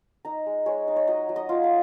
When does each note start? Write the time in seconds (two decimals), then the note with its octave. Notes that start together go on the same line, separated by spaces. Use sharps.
0.25 D#4 A#5
0.46 G#3
0.66 G#3 C#5
0.88 D#4
0.96 C#5
1.08 F#3 D#5
1.29 F#3
1.36 D#5
1.49 F4
1.64 F5